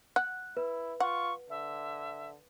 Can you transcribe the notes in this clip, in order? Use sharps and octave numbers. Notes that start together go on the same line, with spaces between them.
F#5 F#6
E4 B4
F4 F#5 C#6
D3 E5